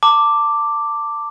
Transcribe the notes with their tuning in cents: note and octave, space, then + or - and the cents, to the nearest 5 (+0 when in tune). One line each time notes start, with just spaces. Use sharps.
A5 +30 D6 +0